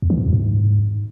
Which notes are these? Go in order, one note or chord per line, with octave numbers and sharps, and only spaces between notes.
E2
E3
G#2
E2
G#2